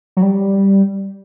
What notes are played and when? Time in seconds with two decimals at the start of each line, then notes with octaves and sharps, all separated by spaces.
0.17 F#3
0.22 G3